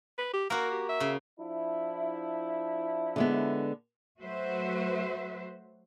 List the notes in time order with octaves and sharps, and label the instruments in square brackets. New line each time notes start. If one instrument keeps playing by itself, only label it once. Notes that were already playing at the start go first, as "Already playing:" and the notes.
[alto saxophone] B4
G4
[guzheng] A#3 F#4 [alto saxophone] A#4
[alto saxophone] G4
E5
[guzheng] C#3
[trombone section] F3 D4 E4
[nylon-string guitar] D3 G#3 B3
[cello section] F#3 A3 F#4 B4 C5 E5